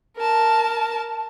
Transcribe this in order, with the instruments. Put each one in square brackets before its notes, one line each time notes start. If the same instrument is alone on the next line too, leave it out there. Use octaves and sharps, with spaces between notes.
[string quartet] A#4 A5